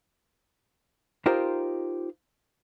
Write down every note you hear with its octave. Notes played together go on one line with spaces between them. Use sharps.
D#4 F4 G4 A#4 C5